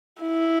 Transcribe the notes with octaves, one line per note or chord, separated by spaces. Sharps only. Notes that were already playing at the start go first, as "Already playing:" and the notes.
E4